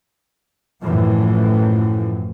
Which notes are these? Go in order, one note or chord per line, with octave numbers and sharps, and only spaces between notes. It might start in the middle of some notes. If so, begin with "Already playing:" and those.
F#2 A2 E3 F3